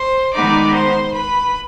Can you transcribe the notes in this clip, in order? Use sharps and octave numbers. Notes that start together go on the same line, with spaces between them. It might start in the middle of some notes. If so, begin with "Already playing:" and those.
Already playing: C5 C6
D#3 G#3 B3 D#4 D5 D6
C5 C6
B4 B5